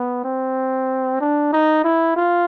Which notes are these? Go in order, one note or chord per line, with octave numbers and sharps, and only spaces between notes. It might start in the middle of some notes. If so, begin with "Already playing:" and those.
Already playing: B3
C4
D4
D#4
E4
F4